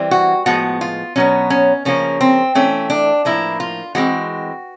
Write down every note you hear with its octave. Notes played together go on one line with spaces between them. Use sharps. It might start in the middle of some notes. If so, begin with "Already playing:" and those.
Already playing: E3 G3 C4
F#4
A2 F3 G#3 B3 F#4
F4
B2 F#3 B3 C#4
C#4
C#3 F3 A#3 C#4
C4
E3 A3 C4 C#4
D4
A2 F3 A#3 E4
F4
E3 G#3 C4 F#4